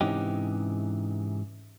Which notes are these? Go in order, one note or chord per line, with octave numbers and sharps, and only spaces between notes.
G#2 C3 E3 C#4 D#4 G4